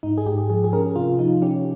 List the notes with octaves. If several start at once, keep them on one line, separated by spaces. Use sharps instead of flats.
G#2 D#4
G#4
G#2 G4
F3 G#4
G#4
C#4 A#4
C3 F4
F3 D#4
C#4 G4